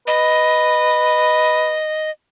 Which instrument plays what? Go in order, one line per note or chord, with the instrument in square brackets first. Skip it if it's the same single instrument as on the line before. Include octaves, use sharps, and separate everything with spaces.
[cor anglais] B4 [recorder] D#5